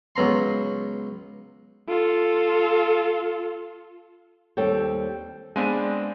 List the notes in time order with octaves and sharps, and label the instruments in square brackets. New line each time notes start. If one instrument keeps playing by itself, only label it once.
[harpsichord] C#2 F#3 B3 A#5 C6
[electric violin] F4 A4
[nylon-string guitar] D#2 G3 C4 A4 C#5 G5
[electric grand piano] G#3 C4 D4 [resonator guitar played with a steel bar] B3 F5 G#5